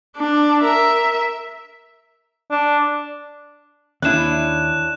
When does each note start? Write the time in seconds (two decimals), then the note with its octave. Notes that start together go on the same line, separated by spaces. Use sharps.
0.17 D4
0.62 A#4 E5
2.51 D4
4.02 D#2 C#4 D4 E4 F#6 E7